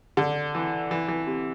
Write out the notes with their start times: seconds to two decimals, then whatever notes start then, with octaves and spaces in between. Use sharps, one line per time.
0.17 D3
0.55 E3
0.91 E3
1.08 E3
1.27 C3